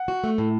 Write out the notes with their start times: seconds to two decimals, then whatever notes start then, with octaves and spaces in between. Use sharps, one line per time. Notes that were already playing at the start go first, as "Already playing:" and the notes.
Already playing: F#5
0.08 F#4
0.24 A3
0.38 A2